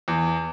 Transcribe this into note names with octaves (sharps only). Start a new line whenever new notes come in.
E2